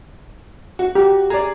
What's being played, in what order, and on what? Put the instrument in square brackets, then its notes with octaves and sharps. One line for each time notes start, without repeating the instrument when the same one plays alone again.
[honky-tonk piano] F#4
[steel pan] G4
[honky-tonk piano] G#4 D5 [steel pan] A#5